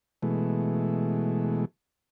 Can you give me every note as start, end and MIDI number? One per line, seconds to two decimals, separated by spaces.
0.23 1.65 47
0.23 1.65 52
0.23 1.65 56
0.23 1.65 57